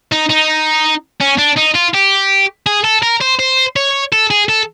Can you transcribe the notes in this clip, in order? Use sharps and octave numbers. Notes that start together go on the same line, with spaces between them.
D#4
D#4
C#4
D4
D#4
F4
G4
G#4
A4
A#4
C5
C5
C#5
A4
G#4
A4